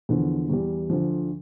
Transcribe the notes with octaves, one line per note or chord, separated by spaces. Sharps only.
E2 D3 F3
E2 E3 G3
D2 D3 F3